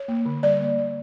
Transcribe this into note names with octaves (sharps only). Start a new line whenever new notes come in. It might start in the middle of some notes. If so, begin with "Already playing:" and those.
Already playing: C#5
A#3
D3
G3 D5
A#3
G3